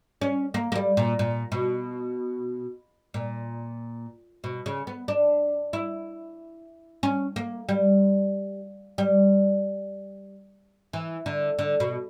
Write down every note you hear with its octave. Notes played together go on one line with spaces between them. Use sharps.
C#4
A#3
A#3
G3
A#2
A#2
B2
A#2
B2
C#3
B3
D4
E4
C#4
A#3
G3
G3
E3
D3
D3
B2